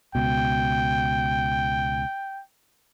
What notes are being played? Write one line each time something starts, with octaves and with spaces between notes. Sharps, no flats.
C#2 B2 G5